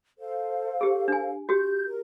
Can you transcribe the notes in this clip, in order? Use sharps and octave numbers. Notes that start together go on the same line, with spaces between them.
A4 C5 F5
G4 G#4
D4 G#5
F#4 G4 G6
A#4